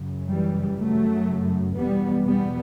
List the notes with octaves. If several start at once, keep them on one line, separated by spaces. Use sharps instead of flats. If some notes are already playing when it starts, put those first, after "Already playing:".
Already playing: F#2 C#3
E3 G3
F#2 C#3 F#3 A3
E2 B2 G3 B3
G3 B3